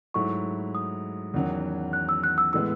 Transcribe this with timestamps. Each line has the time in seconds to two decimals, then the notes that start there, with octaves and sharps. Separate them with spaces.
0.14 G#2 F#3 A3 E4 C#6
0.75 D#6
1.34 E2 D#3 F#3 C#4
1.93 F#6
2.09 E6
2.24 F#6
2.38 E6
2.53 A2 E3 G#3 B3 E6